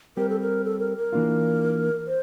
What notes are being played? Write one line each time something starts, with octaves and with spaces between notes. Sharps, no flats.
G3 C4 G4 A#4
A4
A#4
A4
A#4
A#4
E3 A#3 D4 F4
C5